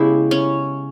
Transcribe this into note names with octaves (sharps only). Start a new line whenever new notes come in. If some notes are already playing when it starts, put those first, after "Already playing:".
Already playing: C#3 G#3 B3 E4 G4
C#4